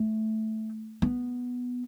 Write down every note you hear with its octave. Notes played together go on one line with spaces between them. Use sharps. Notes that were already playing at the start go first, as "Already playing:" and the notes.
Already playing: A3
B3